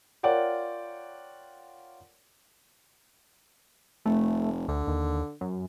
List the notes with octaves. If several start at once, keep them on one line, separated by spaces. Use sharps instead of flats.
F4 A#4 C#5 D5 F#5 G5
F1 A3
D2 D3
D#2
F#2